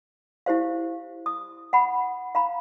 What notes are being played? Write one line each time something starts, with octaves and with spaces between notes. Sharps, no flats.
E4 G4 C5 F5
D#6
F#5 B5
F5 A#5 B5